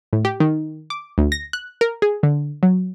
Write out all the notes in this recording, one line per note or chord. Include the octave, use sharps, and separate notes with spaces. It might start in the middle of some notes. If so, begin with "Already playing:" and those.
A2
G4
D#3
D6
D2
A#6
F#6
A#4
G#4
D3
F#3